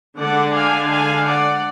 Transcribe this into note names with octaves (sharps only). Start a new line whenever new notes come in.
D3 G#3 D4 D5 F#5
F5 G#5
F5 G#5
D5 F#5